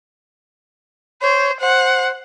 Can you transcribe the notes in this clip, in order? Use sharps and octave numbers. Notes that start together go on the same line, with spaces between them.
C5 C#5
C5 F#5